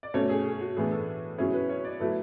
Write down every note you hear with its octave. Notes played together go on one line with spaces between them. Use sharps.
D5
B2 A3 C#4 C#5
G#4
G#4
F#4
A2 E3 B3 D4 G#4
A4
B2 F#3 C#4 E4 G#4
B4
C#5
D5
B2 F#3 A3 E4 B4